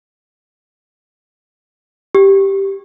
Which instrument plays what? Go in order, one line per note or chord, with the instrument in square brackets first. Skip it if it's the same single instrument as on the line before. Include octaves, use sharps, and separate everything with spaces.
[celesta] G4